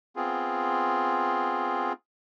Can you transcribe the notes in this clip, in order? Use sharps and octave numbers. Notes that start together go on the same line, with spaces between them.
B3 C4 F4 G#4